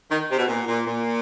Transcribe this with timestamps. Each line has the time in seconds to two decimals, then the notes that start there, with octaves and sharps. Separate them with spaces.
0.10 D#3
0.30 C3
0.38 B2
0.47 A#2
0.66 A#2
0.85 A#2